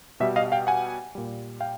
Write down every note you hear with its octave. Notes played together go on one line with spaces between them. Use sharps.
B2 G3 E5
D#5 F5
F5 G5
F#5 G#5
A#2 G3
F5 G5